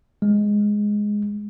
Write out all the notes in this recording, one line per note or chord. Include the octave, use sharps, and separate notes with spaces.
G#3